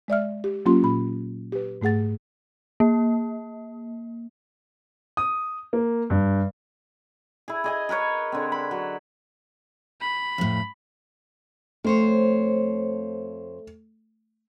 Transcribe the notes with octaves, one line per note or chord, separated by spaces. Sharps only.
G#3 D5 E5 F6
G4
F#3 A#3 C#4 F4 G4 C6
A#2 B5
G4 B4
G#2 A3 G#4 F#5 A6
A#3
D#6
A#3
G2
E4 G#4
G#4 D#5 G#5
G#4 A#4 B4 C#5
D3 C4
B5
F#3
B5
F2 A2
F2 A3 C5 C#5